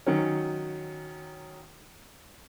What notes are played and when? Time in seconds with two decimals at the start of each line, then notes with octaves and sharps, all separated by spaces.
0.07 D#3 F#3 C#4